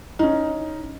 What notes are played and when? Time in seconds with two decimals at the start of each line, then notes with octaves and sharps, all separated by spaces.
0.19 C#4 D#4